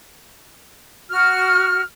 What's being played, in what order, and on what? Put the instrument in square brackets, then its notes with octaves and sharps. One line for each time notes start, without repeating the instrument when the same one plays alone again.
[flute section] F#4 F6